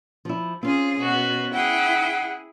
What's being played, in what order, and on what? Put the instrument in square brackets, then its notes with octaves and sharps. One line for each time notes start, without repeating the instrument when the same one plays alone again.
[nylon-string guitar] F3 E4
[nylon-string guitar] C4 C#4 [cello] F4 G#4
[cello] B2 [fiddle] B3 F#4
[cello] E4 G#4 [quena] F#5 [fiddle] G5